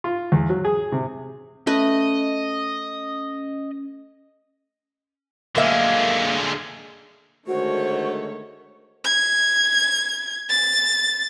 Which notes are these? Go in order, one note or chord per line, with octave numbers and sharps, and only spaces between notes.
F4
E2
F#3
G#4
C3
A3 C#4 B4 D#5
F#2 D3 G#3 A#3 E5
D3 D#3 G#3 A3 F#4 C5 C#5
G#6
A6